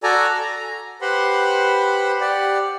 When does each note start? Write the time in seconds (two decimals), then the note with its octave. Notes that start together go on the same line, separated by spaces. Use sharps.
0.03 F#4 A4 D5 G#5 A#5
0.33 A#5
1.01 G4 B4 C5 F#5 B5 C6
2.21 G4 D5 F#5